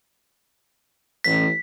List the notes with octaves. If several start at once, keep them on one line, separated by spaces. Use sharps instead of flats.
A1 B6